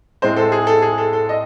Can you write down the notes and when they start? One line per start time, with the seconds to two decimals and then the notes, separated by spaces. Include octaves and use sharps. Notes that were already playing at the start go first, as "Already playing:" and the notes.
0.22 A2 G#3 C4 C5
0.37 A4
0.52 G#4
0.67 A4
0.82 G#4
0.98 A4
1.13 A4
1.29 D#5